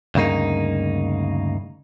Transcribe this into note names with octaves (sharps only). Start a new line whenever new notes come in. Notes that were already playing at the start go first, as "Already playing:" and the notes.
D2 G2 C#3 A#3 D#4